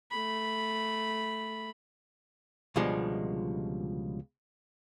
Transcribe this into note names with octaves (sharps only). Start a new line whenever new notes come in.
A3 B5
C#2 B2 D3 F3 G3 G#3